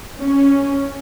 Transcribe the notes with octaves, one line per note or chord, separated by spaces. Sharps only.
C#4